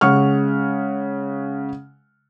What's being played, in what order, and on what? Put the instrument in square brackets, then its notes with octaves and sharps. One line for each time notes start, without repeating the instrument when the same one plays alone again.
[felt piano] C#3 G#3 F#5 C#6 F6